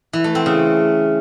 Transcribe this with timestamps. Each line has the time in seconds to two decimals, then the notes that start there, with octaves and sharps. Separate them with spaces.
0.13 E3
0.24 A3
0.35 C4
0.46 C#3